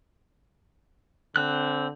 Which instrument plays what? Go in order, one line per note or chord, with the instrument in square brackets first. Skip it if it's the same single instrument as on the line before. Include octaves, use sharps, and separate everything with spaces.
[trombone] D3 [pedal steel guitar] C4 F#6